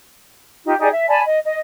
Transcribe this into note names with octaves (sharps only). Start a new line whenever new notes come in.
D#4 F4 G4
D#4 G4 G#4 D5
E5
D5 G#5 A5 B5
D#5
D#5